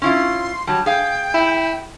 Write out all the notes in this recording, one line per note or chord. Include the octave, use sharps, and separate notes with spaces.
C#4 E4 F4 C6
F#3 G3 A5
G#4 F5 G5
E4